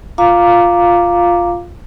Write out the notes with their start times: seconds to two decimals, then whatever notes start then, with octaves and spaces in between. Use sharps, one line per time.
0.18 F4 F5 A#5 D6